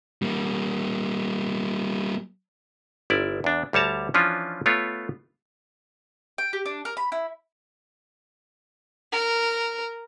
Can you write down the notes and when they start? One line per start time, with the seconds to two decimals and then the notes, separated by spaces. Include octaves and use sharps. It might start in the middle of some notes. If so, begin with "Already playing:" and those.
0.22 G3 A#3
3.10 G1 E4 D5
3.44 E2 D4
3.73 D2 G3 C#5 A5 A#5
4.14 E3 F3 C#4 D4 F4
4.66 A3 B3 F4 A4 C#5
6.38 G5
6.53 G4
6.66 D4
6.85 A#4
6.97 B5
7.12 E4
9.12 A#4